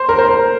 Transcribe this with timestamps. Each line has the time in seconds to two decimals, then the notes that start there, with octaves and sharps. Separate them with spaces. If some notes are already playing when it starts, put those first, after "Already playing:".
Already playing: C5
0.09 A#4
0.19 C5
0.29 A#4